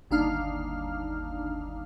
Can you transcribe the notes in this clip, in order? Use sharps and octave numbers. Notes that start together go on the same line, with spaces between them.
G1 D#2 D4 D#4 F5 F6